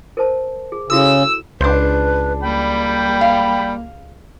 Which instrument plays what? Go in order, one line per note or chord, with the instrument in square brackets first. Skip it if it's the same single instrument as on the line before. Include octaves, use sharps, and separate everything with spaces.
[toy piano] A#4 C5 A5
G#4
[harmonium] C#3 [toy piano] E4 F#4 A4 [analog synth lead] E6
[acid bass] C#2 [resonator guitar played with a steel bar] D4 C5 [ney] B4
[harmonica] G3 G5 B5 [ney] A#3
[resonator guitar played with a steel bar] F5